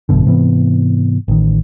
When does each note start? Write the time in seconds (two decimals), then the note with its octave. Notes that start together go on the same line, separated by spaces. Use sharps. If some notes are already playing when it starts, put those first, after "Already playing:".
0.09 G#1 F#2 B2 D3
0.26 G#2 C3 E3 B3
1.28 A1 D#3